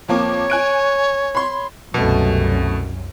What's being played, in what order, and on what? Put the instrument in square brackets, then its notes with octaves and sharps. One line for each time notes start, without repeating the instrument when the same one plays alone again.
[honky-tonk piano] F2 A#3 D6 [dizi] C#5
[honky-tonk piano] G#5 F#6 D7
B5 C6
[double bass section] C2 F#2 [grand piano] B2 A3